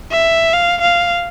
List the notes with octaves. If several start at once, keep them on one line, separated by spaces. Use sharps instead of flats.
E5
F5
F5